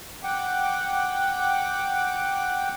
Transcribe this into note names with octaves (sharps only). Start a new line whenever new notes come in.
F#5 G5 D6